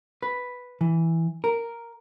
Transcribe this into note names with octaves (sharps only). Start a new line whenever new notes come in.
B4
E3
A#4